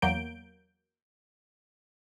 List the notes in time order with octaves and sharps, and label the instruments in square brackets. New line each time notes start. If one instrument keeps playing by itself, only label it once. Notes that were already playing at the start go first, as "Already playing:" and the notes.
[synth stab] E2 F#3 A#3 G6 D7